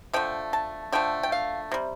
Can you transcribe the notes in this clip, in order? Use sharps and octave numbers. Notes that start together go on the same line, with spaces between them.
D3 F3 A3 G5
A5
D3 F3 A3 G5
G5
F5
C3 G3